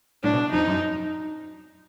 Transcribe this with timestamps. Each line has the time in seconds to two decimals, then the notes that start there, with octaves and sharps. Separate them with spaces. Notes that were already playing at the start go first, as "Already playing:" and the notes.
0.23 A2 D4
0.33 B2
0.52 F2 D#4
0.67 F#2